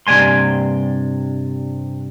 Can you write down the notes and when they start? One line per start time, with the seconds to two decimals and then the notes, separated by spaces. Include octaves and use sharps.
0.07 G2 C3 D5 G#5 C6